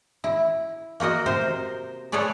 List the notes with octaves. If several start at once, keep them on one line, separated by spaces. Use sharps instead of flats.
E4
A#3 F#4 A#4 D#5
C3 A#4 C5
G#4 A4 B4 C#5 D5